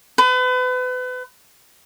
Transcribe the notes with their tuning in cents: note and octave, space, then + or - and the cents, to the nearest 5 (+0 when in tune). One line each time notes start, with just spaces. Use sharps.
B4 +35